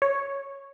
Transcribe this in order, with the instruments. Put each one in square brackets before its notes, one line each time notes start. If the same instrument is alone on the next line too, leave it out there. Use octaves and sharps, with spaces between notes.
[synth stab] C#5